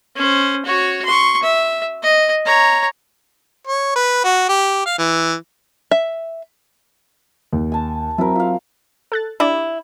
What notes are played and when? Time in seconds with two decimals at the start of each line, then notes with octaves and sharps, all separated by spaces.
0.15 C#4 C5
0.65 F#4 C#5
1.05 C6 C#6
1.43 E5
2.03 D#5
2.45 C#5 A#5
3.67 C#5
3.96 B4
4.24 F#4
4.49 G4
4.86 F5
4.98 E3
5.91 E5
7.53 D#2
7.72 G#5 A5
8.18 F#3 C4 E4 A#4
8.36 F4 F5
9.12 A4 F#6 A6
9.40 D4 E4 G4 D5